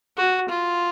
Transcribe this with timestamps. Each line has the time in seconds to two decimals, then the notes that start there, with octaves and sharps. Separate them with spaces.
0.17 F#4
0.49 F4